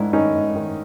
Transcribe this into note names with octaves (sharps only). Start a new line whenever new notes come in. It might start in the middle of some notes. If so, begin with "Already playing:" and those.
Already playing: G#2 D#3 D4 E4
D#3 C#4 D#4
G#2
D#3